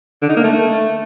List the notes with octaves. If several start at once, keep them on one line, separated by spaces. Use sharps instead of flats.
D3
D#4
A#3
A3